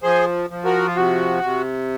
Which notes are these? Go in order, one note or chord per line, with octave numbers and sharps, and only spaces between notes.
F3 G#4 C5
F3
F#4 A#4
F4
C3 F#4
C3